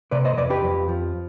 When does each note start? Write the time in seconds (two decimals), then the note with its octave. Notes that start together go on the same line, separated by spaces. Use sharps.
0.11 C3 B4 D5
0.25 C5 D#5
0.37 F2 B4 D5
0.50 G4 B4
0.64 F2
0.88 F3